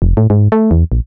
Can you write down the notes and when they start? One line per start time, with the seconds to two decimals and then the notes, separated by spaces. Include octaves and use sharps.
0.02 F1
0.17 A2
0.30 G#2
0.52 A3
0.71 E2
0.92 A#1